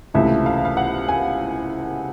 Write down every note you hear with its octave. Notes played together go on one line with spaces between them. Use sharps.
C#2 C3 E3 A3 E5
F5
F5
F#5
G#5